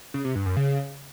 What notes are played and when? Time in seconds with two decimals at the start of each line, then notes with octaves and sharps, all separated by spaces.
0.14 C#3
0.25 C3
0.35 G2
0.46 F#2
0.57 C#3